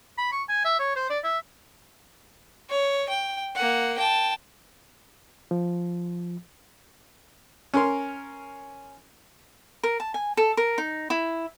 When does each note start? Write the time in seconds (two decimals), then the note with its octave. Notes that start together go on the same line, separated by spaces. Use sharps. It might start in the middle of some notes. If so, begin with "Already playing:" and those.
0.18 B5
0.32 C#6
0.49 G#5
0.65 E5
0.79 C#5
0.96 C5
1.10 D5
1.24 E5
2.70 C#5
3.09 G5
3.55 A#3 F#5
3.98 G5 A5
5.51 F3
7.74 C#4 A#4 C6
9.83 A#4
10.00 A5
10.14 G#5
10.37 A4
10.57 A#4
10.78 D#4
11.10 E4